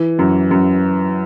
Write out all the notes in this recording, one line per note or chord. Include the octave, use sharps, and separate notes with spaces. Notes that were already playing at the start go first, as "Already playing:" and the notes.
Already playing: E3
F#2
F#2